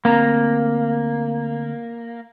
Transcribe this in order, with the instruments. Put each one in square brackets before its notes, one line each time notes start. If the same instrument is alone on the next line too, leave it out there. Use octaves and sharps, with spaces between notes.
[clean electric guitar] D2 C4 A#5 [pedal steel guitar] A#3